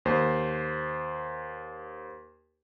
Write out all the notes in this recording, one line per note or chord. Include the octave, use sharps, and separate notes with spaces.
D#2 C5